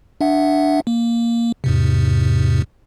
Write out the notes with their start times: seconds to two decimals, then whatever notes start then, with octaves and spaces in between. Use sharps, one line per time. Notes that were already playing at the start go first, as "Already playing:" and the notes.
0.21 D4 E5 F#5
0.87 A#3
1.64 E2 G#2 C3